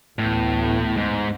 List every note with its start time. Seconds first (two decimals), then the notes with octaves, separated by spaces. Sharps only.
0.19 A1 D2 A2 B3
0.97 G#2